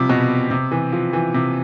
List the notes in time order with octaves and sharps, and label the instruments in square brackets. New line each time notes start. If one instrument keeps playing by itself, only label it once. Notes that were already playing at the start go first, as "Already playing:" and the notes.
Already playing: [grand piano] C3 F3 G3
B2
C3
E3
F3
E3
C3